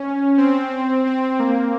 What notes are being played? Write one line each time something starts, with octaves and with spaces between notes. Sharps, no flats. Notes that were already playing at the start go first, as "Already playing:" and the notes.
Already playing: C#4
C4
C4
A#3